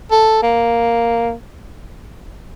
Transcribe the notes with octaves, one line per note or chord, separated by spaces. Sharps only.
A4
A#3